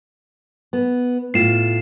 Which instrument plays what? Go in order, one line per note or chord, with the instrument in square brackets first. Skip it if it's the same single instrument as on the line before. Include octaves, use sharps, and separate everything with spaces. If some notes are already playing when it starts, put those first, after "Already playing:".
[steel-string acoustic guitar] B3
[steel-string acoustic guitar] A2 F4 [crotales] C7 E7